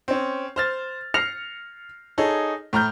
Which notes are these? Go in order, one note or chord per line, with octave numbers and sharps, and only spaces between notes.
C4 C#4
C5 F6 A6
F6 A#6 C7 C#7 F7
D#4 G#4 A4 C#5
A2 A#5 F6 G6